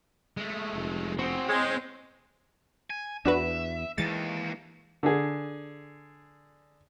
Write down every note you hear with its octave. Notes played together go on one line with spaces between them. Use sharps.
G#3 A3
F1
C4 F#4 G#4
G#3 C#5 G5
G#5
E2 D4 F#4 B4 E5
D#2 D#3 E3 G#3 A6
D3 G#4